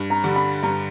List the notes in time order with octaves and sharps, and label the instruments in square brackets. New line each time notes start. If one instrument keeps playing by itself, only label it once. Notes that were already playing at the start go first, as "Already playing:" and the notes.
Already playing: [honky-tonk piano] G2
[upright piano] A#5
[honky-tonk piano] D3 G3
[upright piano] B5
[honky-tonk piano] G2 [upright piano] A#5